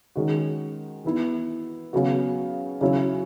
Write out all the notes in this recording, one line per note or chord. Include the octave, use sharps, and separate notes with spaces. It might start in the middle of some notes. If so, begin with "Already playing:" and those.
D#3 G#3 C#4 F#4
E3 B3 E4
C#3 F#3 B3 F#4
C#3 F#3 C#4 E4